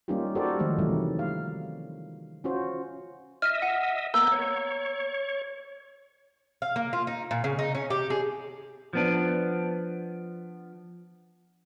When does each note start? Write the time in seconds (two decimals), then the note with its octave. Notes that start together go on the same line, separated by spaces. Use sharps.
0.08 G3 A#3 C#4 D#4 F4 G4
0.35 F#4 G4 A4 A#4 C5 D5
0.59 D#3 F3 G#3 A3 D#4
0.78 C3 E3 F#3 G3 A3 E4
1.19 F5
2.44 C#4 F4 F#4 C5
3.42 D#5 E5 F6
3.62 F#5 D#7
4.14 A#3 B3 A#5 E6 G6
4.32 C#5
6.62 F5
6.76 A#3
6.93 F4
7.07 D#4
7.31 A#2
7.44 C#3
7.59 D#4
7.75 C#4
7.90 G4
8.10 G#4
8.93 F3 B3 D4